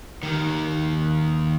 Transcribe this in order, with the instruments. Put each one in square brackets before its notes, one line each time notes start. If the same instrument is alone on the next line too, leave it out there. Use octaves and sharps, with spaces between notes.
[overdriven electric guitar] D#2 D#3